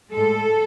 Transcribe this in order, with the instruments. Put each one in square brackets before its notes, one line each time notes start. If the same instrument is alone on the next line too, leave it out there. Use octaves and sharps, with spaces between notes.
[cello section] A2 G#3 A4